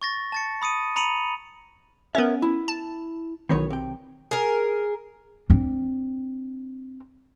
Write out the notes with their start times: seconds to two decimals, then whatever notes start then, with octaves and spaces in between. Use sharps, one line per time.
0.02 C#6 A6 A#6
0.32 A5 A6 C#7
0.62 B5 D#6 C#7 D#7
0.96 A#5 B5 C#7 D#7 F7 F#7
2.15 B3 C#4 A#4 C#5 E5
2.42 E4
2.68 A5
3.49 B1 D#3 E3 B3 C#5
3.70 C3 G5
4.31 G#4 A#4
5.50 C4 D4